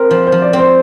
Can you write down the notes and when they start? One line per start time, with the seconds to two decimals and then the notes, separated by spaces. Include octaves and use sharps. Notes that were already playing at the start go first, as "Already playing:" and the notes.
Already playing: C4 A#4
0.10 F3 C5
0.27 C5
0.32 F3
0.42 D5
0.53 C4
0.59 C5